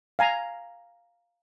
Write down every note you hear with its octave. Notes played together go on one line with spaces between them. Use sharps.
F5 G#5 A#5